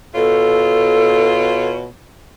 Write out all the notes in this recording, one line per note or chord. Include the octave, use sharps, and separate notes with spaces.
B2 F4 A4 C#5